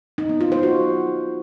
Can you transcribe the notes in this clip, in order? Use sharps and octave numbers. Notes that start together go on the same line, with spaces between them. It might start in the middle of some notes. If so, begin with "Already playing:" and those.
D#4
B3
F4
C5
F#4